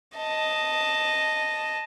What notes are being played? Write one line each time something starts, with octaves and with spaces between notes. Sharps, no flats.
D#5 A5